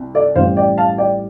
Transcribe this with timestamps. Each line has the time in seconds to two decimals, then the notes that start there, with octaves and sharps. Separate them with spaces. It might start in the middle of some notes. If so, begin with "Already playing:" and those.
Already playing: C2
0.15 A4 D5
0.35 A1 A2 G3 C4 C5 F5
0.57 D5 G5
0.78 F5 A5
0.98 D5 G5